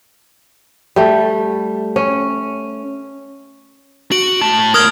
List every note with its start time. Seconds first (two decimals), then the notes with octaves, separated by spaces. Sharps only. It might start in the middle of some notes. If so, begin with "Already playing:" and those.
0.96 G3 A3
1.96 C#4
4.12 F#4 D7 F#7
4.41 A2 A5
4.74 A2 A#4 D#6 F6 G#6